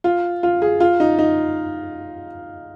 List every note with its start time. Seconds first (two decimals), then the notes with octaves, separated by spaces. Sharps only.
0.04 F4
0.43 F4
0.62 G#4
0.80 F4
1.00 D#4
1.19 D#4